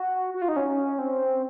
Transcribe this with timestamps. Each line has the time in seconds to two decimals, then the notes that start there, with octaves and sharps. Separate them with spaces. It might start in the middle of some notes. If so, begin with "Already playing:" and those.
Already playing: F#4
0.34 F#4
0.42 F4
0.48 D#4
0.56 C#4
0.99 C4